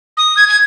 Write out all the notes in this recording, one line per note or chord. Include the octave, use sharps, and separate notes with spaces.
D#6
G#6
G#6